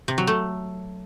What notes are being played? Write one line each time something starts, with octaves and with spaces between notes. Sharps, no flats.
C3
F#3
A3